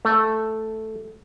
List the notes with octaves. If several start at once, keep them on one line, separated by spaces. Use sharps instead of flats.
A3